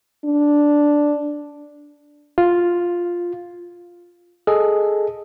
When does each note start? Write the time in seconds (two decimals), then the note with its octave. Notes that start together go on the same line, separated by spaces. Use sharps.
0.25 D4
2.38 F4
4.47 G#4 A4 D#5